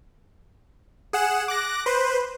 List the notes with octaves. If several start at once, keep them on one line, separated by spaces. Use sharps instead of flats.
G#4 F#5 E7
D6 F#6 A#6
B4 C5